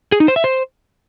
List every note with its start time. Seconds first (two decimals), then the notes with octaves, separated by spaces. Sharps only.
0.12 G#4
0.20 D#4
0.28 C5
0.36 E5
0.44 C5